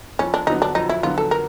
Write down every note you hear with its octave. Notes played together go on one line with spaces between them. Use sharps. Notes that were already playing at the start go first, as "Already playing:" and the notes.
F2 C#4
D4
D3 F#3 B3 D#4
D4
F2 D#4
E4
D3 F#3 B3 F4
A4
A#4